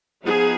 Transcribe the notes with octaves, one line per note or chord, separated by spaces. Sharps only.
F3 B3 D#4 G#4